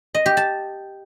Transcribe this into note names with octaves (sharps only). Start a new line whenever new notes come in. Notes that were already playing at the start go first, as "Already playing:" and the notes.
D#5
G4
A5